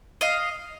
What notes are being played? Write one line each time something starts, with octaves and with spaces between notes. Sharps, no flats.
D#5 F5